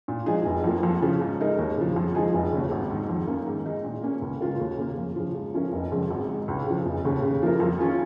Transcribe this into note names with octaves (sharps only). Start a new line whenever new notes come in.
A#2
F3 G#3 D#4 G#4
F1
F2 F3 A#3
F2
C#3 F3 C#4
G#2
G#3 D#4 A#4
D#2
C#3 F3
F2
F3 G#3 D#4 G#4
F1
D#2 C#3
G#1
G#2 D#3
F2
D#3 A#3 C#4
G#2
D#3 G#3 D#4
A#2
A#3 C#4 G#4
C#2
C#3 G#3 F4 A#4
D#2
C#3 A#3
F2
C#3 F3
G#2
F3 C#4 A#4
F1
F2 C#3 G#3
G#1
G#2
G#3
C#2
C#3 F3
F1
D#2 C#3
C#3
F3 A#3 F4 A#4
F2
D#3 C#4 F4 G#4